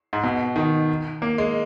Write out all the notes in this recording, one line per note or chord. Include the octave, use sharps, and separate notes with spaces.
G#2
B2
D#3
A#3
G#3